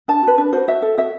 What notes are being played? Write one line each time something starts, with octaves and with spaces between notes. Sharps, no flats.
D4 A5
F#4 B4
D4 B4
F#4 B4 C5
F#4 E5
A4
F#4 E5